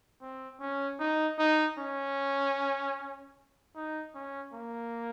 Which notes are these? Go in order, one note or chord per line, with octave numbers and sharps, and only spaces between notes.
C4
C#4
D#4
D#4
C#4
D#4
C#4
A#3